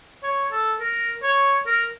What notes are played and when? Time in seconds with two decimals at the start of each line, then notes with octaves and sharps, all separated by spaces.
0.23 C#5
0.52 A4
0.80 A#4
1.23 C#5
1.66 A#4